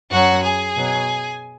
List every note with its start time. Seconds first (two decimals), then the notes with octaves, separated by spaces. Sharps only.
0.10 F#2 F#3 F#4 F#5
0.43 G#4 G#5
0.75 B2 F#3